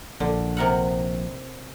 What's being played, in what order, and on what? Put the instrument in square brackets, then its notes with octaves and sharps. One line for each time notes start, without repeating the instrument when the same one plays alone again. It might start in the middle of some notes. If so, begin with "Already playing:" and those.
[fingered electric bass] A#1 [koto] D3
[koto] C3 A#4 F#5